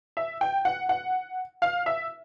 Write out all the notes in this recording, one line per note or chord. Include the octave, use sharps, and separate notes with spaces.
E5
G5
F#5
F#5
F5
E5